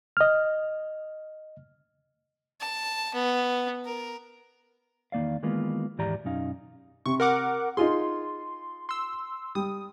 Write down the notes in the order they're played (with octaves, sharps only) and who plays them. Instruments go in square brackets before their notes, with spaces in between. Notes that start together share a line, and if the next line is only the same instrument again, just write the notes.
[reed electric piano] D#5 F6
[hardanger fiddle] A5
B3
A#4
[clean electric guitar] E2 D#3 A#3 D5 F5
D#3 E3 G#3 A#3 B3 F4
D#2 G#2 E3 G4 D5 A#5
B1 F#2 C#4 D#4 F5
[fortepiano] C3 [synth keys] C#6
[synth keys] A#4 F#5 D6
[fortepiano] D#4 F4 G#4 [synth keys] C6
[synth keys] C6 E6
[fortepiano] G3 [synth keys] D#6